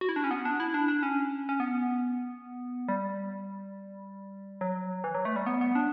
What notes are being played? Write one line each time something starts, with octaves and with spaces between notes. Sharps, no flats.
F#4
E4
D4
C#4
B3
D4
E4
D4
D4
C#4
C#4
B3
G3
F#3
E3
F#3
A3
G3
B3
B3
D4